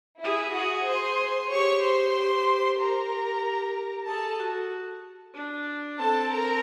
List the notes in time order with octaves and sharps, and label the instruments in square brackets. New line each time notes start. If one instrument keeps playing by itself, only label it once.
[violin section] E4 E5 [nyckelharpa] G#4
[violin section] F#4 F#5
C5 C6
[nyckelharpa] G4 [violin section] C#5 C#6
[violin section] C5 C6
[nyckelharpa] G4
[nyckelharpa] G4 [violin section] A#4 A#5
[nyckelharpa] G#4 [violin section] A4 A5
[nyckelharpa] F#4
D4
[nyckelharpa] C4 [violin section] A4 A5
[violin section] A#4 A#5